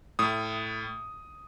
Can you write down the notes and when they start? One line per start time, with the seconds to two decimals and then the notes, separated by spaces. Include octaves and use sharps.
0.19 A2 D#6